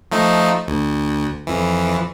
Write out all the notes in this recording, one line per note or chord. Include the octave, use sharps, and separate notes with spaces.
F3 A3 D#4
D2
F2 E3